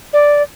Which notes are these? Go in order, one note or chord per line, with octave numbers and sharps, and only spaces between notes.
D5